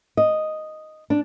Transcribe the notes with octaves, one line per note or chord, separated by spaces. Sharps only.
D#5
D4